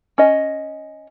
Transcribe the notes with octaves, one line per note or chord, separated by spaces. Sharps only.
C#4 D#5